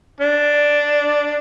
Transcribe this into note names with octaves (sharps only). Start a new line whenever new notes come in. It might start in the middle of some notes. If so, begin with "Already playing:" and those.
D4